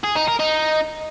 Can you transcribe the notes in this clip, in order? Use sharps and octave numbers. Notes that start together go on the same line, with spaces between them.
G#4
D#4
A#4
D#4